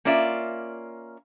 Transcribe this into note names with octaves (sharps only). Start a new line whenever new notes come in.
A#3 C#4 F4 D5 E5